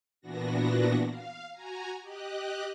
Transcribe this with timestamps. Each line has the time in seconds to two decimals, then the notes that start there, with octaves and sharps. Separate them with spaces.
0.21 A#2 E3 B3 D4 F#4 A#6
1.07 F5
1.53 F#4 G#5 A#5
2.00 G4 D#5 F#6